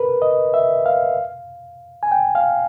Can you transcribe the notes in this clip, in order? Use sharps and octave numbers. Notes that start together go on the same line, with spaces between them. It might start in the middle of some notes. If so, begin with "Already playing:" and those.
Already playing: A#4 B4
D#5
E5
F5
G#5
G5
F5